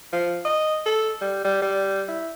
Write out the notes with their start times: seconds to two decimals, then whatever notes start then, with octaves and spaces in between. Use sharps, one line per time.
0.13 F3
0.45 D#5
0.86 A4
1.21 G3
1.44 G3
1.62 G3
2.08 E4